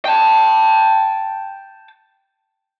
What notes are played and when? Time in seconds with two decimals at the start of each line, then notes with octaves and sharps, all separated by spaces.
0.05 G5 A5